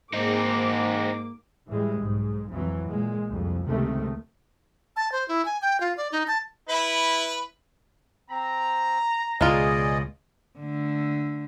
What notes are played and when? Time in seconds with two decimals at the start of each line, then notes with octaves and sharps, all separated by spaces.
0.13 G#2 A#3 C4 D#4 D6
1.68 A2 E3 G3 G#3
1.99 B1 G#2
2.50 F2 E3 F#3
2.87 A#2 G#3
3.28 C2 F2
3.66 C#2 C3 D#3 A3
4.96 A5
5.12 C5
5.28 E4
5.45 G#5
5.62 G5
5.81 F4
5.97 D5
6.12 D#4
6.28 A5
6.69 E4 B4
8.30 C4 A#5
9.41 C#2 B2 G#3 F4 G#4 D5 D#5
10.59 D3 A3